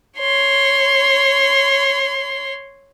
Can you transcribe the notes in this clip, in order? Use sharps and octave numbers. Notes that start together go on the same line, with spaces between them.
C#5 C6